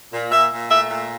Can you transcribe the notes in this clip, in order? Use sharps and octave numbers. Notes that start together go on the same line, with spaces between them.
A#2
A#2 E5
A#2
A3 E5
A#2